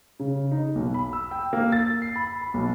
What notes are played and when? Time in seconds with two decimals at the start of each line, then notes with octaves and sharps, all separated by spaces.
0.19 C#3
0.51 D#4
0.75 B1
0.94 B5
1.13 E6
1.31 G5
1.53 A#3
1.72 A6
2.02 C7
2.16 B5
2.41 B5
2.54 B1